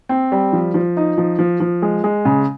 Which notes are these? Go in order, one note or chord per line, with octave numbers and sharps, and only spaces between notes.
C4
G3
F3
F3
D#4
F3
F3
F3
G#3
G#3
C#3